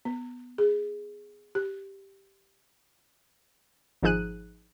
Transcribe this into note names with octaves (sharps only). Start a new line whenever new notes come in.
B3
G#4
G4
G#1 F3 D#4 G#4 F#6 D#7